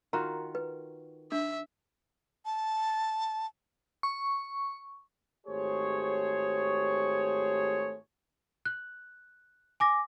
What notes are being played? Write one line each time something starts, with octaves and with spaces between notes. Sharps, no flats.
D#3 F4 F#4 A#4 A#5
B4
D4 E5
A5
C#6
G#1 A3 G4 G#4 C5 C#5
F#6
G#5 D6 A#6